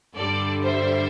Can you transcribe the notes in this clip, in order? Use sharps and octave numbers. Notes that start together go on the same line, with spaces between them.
G2 D3 G3 A4 D5
C5 E5